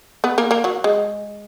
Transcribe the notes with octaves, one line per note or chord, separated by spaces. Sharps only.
B3 B4
A#3 A#4
A#3 A#4
F#3 F#4
G#3